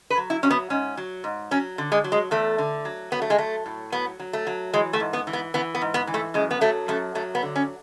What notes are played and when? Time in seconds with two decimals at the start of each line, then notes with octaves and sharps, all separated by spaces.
0.10 B4
0.17 F#3
0.30 E4
0.43 F#3 C#4
0.50 B3
0.70 G#2 C#4
0.97 F#3
1.24 G#2
1.51 F#3 C#4
1.78 D3
1.92 G#3
2.04 F#3
2.12 G#3
2.31 E2 A3
2.58 D3
2.85 F#3
3.12 F#3 B3
3.22 A3
3.30 G#3
3.38 F#3 A3
3.66 A2
3.92 F#3 B3
4.20 F#3
4.33 A3
4.47 F#3
4.73 E3 G#3
4.93 A3
5.00 G#2
5.13 B3
5.27 E3
5.33 B3
5.54 E3 B3
5.75 B3
5.81 G#2
5.94 B3
6.07 E3
6.14 A3
6.34 F#2 G#3
6.51 B3
6.61 F#3 A3
6.88 F#2 A3
7.15 F#3 A3
7.35 B3
7.42 D3
7.56 C#4